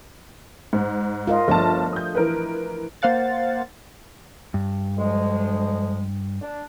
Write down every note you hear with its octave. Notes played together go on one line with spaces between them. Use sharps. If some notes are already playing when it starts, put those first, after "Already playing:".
G#2
F4 A#4 D#5
G1 F3 A3 D4 A5
D#6 G6
E3 A#4 B4
A#3 C5 F5 F#5 A6
G2
D2 F3 G#3
D4